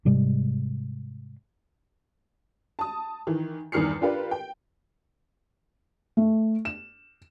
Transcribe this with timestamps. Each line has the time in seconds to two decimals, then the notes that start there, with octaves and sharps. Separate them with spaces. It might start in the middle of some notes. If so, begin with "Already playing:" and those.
0.05 G#2 C3 G3 G#3
2.79 A5 D#6
3.27 D#3 E3
3.72 E2 G2 D#3 F6 C7 C#7
4.01 D4 F4 G4 A#4 B4 D5
4.31 G5
6.17 A3
6.65 E7